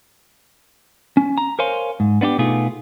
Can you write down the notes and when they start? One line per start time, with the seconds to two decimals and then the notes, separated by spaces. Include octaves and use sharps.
1.17 C#4
1.38 A#5
1.59 A#4 C5 C#5 F5 G#5 C6
2.00 G#2
2.21 B3 D4 E4 G4
2.38 B2 A3 B3 D#4 F4 G#4